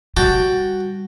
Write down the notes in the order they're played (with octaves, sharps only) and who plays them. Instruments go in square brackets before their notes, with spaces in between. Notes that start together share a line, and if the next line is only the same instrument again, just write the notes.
[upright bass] G3 [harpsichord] F#4 G5 A5